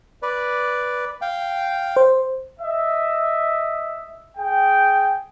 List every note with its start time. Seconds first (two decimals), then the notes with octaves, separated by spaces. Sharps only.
0.23 B4 D5
1.21 F5 G5
1.97 C5
2.60 D#5 E5
4.38 G#4 G5